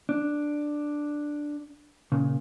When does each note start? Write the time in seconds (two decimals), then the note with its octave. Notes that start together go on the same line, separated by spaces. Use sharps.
0.09 D4
2.12 A#2 C#3